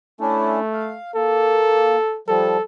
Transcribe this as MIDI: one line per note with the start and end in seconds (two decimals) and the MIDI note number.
0.21 0.97 57
0.21 0.59 61
0.21 0.59 62
0.21 0.59 64
0.73 1.11 77
1.15 1.96 58
1.15 2.19 69
2.28 2.57 53
2.28 2.57 55
2.28 2.63 69